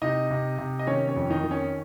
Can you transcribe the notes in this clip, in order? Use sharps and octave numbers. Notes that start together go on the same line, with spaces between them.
C3 D#4 D#5
C3
C3
D#5
D#3 C#4 C#5
C#4 C#5
F2
D#3 D#4
D#3
C#4